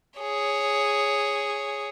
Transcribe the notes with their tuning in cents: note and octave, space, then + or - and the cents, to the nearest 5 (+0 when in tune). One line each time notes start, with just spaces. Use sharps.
G#4 +0 C#5 +0